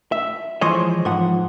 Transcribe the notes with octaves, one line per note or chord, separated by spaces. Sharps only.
E5
E3 F3 G#3 C5 C#5 D#5
G#2 F3 F#5